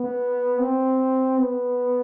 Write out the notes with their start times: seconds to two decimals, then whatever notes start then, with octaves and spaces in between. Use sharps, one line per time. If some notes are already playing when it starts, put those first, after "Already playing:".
Already playing: B3
0.59 C4
1.38 B3